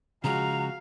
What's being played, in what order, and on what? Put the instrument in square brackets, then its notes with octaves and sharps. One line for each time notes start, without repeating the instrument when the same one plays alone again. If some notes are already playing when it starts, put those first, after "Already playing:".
[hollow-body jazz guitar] C#3 F3 G#3 [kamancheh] F#4 G#4 [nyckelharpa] F5 [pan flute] A#5